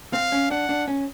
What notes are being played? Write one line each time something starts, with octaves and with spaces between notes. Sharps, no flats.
C4 F5
C#4
D4 F#5
D4
C#4